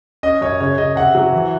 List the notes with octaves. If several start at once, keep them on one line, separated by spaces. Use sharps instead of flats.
C#4 D#5
F#2 C#5
C#3 C#5
C#3 D#5
C3 F#5
F#3
E3